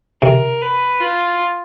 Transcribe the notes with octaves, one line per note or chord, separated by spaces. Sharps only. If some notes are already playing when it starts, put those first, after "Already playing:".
C3 A#4
B4
F4